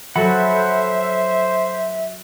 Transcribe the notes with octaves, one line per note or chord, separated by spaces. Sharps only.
F#3 F#4 A4 C5 E5 F#5 B5